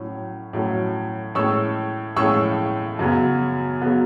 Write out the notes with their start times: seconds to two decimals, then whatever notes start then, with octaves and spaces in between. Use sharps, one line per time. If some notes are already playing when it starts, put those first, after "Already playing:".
Already playing: A2 F#3 C#4
0.53 A2 F#3 C#4
1.35 A2 G#3 C#4 C#6 E6
2.17 A2 G#3 C#4 C#6 E6
2.99 F#2 C#3 F#3 B3
3.81 C#3 F#3 B3